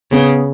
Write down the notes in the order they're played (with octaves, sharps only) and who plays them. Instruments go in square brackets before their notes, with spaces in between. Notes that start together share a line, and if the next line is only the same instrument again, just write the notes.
[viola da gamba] C#3 [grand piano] B3